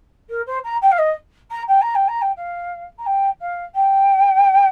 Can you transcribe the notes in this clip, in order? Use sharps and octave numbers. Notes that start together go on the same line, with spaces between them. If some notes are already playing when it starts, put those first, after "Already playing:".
A#4
C5
A#5
G5
F5
D#5
A#5
G5
A#5
G5
A#5
G5
F5
A#5
G5
F5
G5